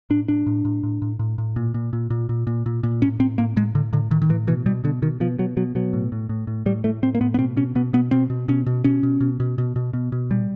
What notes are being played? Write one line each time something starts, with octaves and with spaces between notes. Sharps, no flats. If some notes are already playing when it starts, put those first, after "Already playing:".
A2 D4
A2 D4
A2
A2
A2
A2
A2
A2
A#2
A#2
A#2
A#2
A#2
A#2
A#2
A#2
A2 C#4
A2 C4
A2 A#3
A2 G#3
A2 D3
A2 D3
A2 D#3
D#3
A2 E3
B2 E3
B2 G3
B2 D3
B2 D#3
B2 F3
B2 F#3
B2 F#3
B2 F#3
A2
A2
A2
A2
A2 G3
A2 A3
A2 C4
A#3
A2 B3
B3
B2 C4
B2 C#4
B2 B3
B2 B3
B2 C4
B2
B2 C#4
B2
B2 C#4
B2
B2
B2
B2
B2
B2
B2
A#2 G3